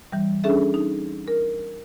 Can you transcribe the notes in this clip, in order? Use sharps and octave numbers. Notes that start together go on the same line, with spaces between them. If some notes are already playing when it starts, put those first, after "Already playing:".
E3 G3
C#4 D4 G#4 A4 E5
D#4
A#4